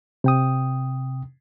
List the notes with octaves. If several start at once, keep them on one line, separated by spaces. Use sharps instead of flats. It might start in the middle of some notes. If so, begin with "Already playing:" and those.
C3 G5 D#6